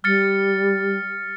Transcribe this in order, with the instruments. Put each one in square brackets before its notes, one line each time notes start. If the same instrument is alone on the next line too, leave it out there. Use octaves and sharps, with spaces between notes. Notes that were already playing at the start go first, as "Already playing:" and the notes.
[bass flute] G3 [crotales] F6 A6 C#7